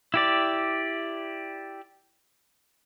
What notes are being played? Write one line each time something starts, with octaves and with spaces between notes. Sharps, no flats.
E4 G4 D5